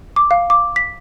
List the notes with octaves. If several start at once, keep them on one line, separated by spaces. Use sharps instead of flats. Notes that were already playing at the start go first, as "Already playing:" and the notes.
D6
F5
D6
B6